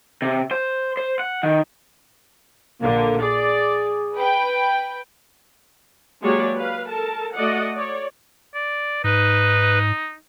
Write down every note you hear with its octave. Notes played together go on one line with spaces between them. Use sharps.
C3
C5
C5
F#5
D#3
A#1 D3 A#3
G#4 D5
B4 G5
F#3 G#3 A#3 G4 C#5 D5
B4 F5
A4 A#4 A5
A3 F#4 D5 D#5 F#5
C#5 D5
D5
G#2 D#4 B4